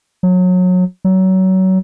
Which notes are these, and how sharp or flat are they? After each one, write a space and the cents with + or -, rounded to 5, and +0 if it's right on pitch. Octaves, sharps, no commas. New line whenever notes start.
F#3 -25
F#3 +25